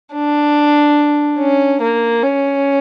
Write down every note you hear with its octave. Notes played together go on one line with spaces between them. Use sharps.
D4
C#4
A#3
C#4